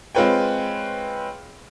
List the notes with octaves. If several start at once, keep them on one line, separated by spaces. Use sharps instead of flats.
G#3 C4 F4 B4 C#5 G5